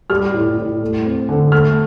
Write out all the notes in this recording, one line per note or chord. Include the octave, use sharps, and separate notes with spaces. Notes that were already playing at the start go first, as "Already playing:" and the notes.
G3 F6
A2
A2
A3
C4
D3
A3 F6